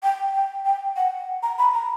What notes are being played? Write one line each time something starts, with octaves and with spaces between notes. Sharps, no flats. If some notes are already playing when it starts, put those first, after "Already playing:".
G5
G5
G5
F#5
A#5
B5
A#5